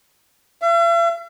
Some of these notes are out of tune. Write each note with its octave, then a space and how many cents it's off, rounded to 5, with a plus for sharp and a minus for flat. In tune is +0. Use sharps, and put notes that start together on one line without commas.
E5 +45